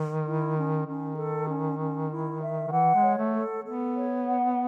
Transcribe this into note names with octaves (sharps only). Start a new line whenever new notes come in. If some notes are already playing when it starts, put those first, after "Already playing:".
Already playing: D#3
E4
C#4
D#3 C#4
A4
C#4
C#4
E4
E5
D#3
E3 F#5
G#3
C#5
A3
A4
B3 A4
C#5
F#5